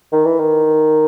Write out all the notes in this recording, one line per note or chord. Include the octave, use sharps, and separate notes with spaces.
D#3
E3
D#3